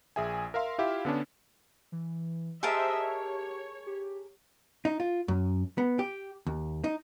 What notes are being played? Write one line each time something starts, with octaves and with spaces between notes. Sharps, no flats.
A#1 G#4 E5 G#5
A#4 E5 F5 C6
E4 F4 G4 E5 F5
D3 B3 C#4 D4
E3
G4 G#4 A#4 C5 D#5 E5 A5
C#5
G4
D#4
F4
F#2
B3
G4
D#2
D#4